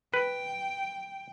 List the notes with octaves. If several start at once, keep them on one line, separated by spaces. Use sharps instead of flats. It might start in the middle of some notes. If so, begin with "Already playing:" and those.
B4 G5